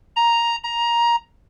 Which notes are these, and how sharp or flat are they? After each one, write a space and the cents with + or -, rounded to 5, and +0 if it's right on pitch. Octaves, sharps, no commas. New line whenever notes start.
A#5 +5
A#5 +15